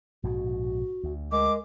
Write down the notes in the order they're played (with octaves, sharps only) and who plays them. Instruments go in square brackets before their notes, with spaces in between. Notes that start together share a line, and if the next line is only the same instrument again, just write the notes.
[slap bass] A#1 G#2 B2 [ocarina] F#4
[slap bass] D2
[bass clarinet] G#3 [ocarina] A#4 [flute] D6